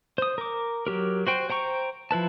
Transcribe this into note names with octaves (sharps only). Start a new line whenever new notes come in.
C5 D#6
A#4 D6
F#3 G4 A#4
F#4 C5 G5
C5 G5 A#5 C#6
F3 E4 B4 A5